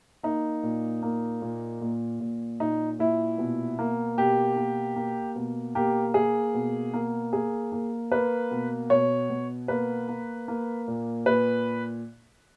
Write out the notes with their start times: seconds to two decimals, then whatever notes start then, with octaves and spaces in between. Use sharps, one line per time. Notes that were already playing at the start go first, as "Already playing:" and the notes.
0.23 A#3 D#4
0.63 A#2
1.03 A#3
1.42 A#2
1.81 A#2
2.20 A#2
2.60 A#2 D#4
2.99 A#2 E4
3.38 B2
3.79 A#3
4.17 B2 G4
4.56 A#3
4.96 A#3
5.36 B2
5.75 A#3 G4
6.14 A#3 G#4
6.54 B2
6.93 A#3
7.33 A#3 G#4
7.72 A#3
8.11 A#3 B4
8.51 B2
8.90 B2 C#5
9.30 B2
9.68 A#3 B4
10.08 A#3
10.48 A#3
10.88 A#2
11.26 A#2 B4